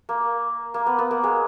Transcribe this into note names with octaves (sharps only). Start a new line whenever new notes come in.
A#3
A#3
B3
B3
A#3
G#3